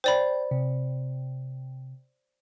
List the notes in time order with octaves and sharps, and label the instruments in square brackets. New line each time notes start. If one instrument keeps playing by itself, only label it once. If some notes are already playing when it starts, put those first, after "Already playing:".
[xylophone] C5 D5 B5 [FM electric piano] G5
[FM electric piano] C3